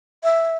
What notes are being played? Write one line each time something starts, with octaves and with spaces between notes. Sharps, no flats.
E5